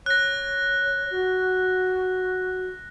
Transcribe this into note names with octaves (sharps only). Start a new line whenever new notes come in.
C#5 F#6 A#6
F#4